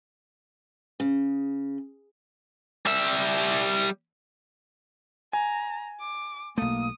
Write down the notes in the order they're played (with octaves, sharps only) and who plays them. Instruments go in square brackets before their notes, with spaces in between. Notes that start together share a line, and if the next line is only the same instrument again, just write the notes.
[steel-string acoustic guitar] C#3
[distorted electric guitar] G3 E5
[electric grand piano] G#5 [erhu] A#5
[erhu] D6
[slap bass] B1 A3 [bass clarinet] A#3 [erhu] D#6